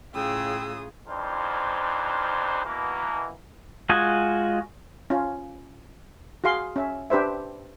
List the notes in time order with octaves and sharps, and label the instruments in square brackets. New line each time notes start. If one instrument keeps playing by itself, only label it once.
[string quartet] A2 C#3 D#6 [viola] F4 G#4 [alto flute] G5 [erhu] E6
[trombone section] F2 E3 D4 D#4 F4 C5
B2 E3 A#3
[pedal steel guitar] G#3 F4 F#4 D#5 G#5
[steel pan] C#4 F4
F#4 G#4 F5 C6
C#4 E5
D4 G4 B4 C5 E5